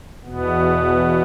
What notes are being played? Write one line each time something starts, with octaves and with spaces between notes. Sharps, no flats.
E2 B2 B3